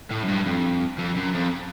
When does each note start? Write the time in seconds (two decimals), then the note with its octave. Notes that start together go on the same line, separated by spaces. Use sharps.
0.11 A2
0.24 F#2
0.28 G2
0.46 F2
0.98 F2
1.16 F#2
1.34 F2